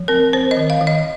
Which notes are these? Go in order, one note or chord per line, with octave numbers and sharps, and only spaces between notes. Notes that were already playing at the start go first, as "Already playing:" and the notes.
Already playing: F3
C4 A#4
C4 C5
D#5
D#3
F5
D#3
D#5